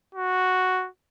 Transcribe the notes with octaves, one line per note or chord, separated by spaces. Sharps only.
F#4